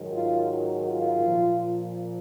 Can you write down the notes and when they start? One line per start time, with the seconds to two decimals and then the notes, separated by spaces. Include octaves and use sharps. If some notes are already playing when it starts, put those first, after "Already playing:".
Already playing: G#2 D#3 F#3
0.12 F4
0.85 F4
1.20 A#2 F3